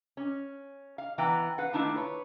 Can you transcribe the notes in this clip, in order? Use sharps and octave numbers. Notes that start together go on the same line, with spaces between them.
C#4
F5
E3 B3 B4 G5 A#5
B4 F5 F#5
D#3 A3 A#3 D4 E4 F4
B4 C#5